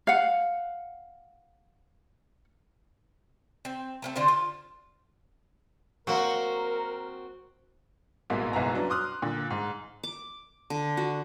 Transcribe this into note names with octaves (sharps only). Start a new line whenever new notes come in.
F5 F#5
C4
A3 A#3 C4
D3 D4 F4 C5
F4
F#3 A#3 C4 F#4 A#4
A1 G#2 B2 A#3 E4
F#1 B1 G#2 B3 E4 A#5
F#3 B3 C#4 D4
C6 D6 D#6 F6 F#6
A#2 D3
G#2
D6
D3
F#4